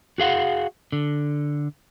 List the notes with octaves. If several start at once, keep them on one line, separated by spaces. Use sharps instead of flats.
F#4 G#4 F5 F#5
D3